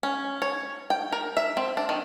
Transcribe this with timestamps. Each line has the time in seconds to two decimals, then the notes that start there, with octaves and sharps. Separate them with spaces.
0.03 C#4
0.42 C#5
0.90 G5
1.12 A#4
1.37 E5
1.57 C4
1.77 D4
1.89 D#3